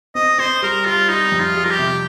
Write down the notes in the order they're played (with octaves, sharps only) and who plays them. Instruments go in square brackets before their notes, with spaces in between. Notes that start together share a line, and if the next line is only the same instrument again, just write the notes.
[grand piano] C4 [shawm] D#5
[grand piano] C4 [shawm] C5
[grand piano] G3 [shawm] A#4
[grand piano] G3 [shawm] F4
[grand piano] G3 [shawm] D#4
[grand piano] F2
[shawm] F4
[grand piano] G3
[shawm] A#4
G4
[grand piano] C3